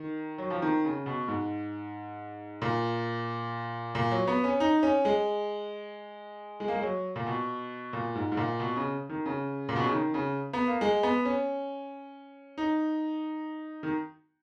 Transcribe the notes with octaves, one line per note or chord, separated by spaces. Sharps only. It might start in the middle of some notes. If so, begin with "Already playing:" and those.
Already playing: D#3
F#3
F3
D#3
C#3
B2
G#2
A#2
A#2
F#3
B3
C#4
D#4
C#4
G#3
G#3
A#3
G#3
F#3
A#2
B2
A#2
G#2
G#2
A#2
B2
C#3
D#3
C#3
A#2
B2
C#3
D#3
C#3
B3
A#3
G#3
B3
C#4
D#4
D#3